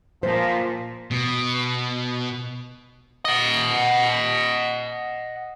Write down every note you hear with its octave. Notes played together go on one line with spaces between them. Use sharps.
A#2 F3 C5
B2
D#5 F#5